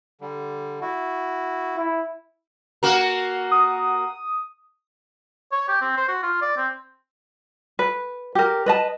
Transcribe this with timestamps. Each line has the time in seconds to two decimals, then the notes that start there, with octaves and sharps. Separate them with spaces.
0.21 D3 G3
0.82 E4 F#4
1.77 E4
2.83 A#3 F#4 A#4
3.51 D#6
5.52 C#5
5.68 G4
5.81 C4
5.97 C5
6.08 F#4
6.23 F4
6.42 D5
6.57 C4
7.79 B4
8.35 G4 A#4
8.66 B4 D#5 A5